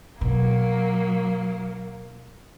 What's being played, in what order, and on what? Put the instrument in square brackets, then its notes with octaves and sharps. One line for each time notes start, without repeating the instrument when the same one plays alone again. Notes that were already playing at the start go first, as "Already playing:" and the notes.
[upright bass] B2 [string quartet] F#3 A#3